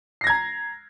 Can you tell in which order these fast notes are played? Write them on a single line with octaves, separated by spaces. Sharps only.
C7 A#6 G#6 A#5